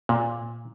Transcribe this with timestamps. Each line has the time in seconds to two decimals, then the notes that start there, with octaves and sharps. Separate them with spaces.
0.09 A#2